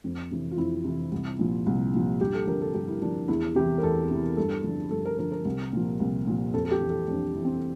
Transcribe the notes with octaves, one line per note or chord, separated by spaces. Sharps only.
F2
C3 E3
F4
F2 E4
C3 E3
C2
A#2 F3
C2
A#2 F3
G2 G4
A4
D3 F3 A#4
A4
G2 G4
E4
D3 F3 D4
E2 E4
C3 E3 G4
A#4
E2 A4
C3 E3
G2 A4
D3 F3
G2 A4
A#4
D3 F3 A#4
A#4
C2
A#2 F3
C2
A#2 F3
F2 A4
A4
G4
E3
A4
F2 D4
E3
C4